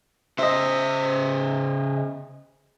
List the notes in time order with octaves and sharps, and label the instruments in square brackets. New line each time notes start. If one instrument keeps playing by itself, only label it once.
[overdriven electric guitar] C#3 C5 [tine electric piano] D#5 E5